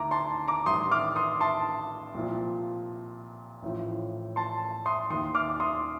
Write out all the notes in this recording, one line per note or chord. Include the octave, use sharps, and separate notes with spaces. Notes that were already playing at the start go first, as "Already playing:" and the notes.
Already playing: D2 D#3 A#5 D6
A5 C6
A#5 D6
A1 G2 D#3 C6 D#6
D6 F6
C6 D#6
A5 C6
C2 A#2 F3
A1 A2 F3
A5 C6
C6 D#6
D#2 D#3 C6 D#6
D6 F6
C6 D#6